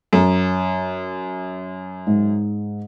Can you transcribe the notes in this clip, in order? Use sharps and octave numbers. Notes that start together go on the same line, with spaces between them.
F#2
G#2